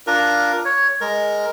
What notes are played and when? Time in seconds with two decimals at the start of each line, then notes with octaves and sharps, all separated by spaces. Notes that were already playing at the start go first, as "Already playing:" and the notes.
0.07 D4 F4 A#4
0.65 C#5
1.01 G#3 A#4